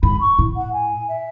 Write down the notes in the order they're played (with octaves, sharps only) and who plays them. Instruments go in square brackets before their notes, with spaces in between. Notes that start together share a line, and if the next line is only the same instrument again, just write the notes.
[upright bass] G#2 [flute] B5
[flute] C#6
[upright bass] A2
[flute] F#5
G#5
E5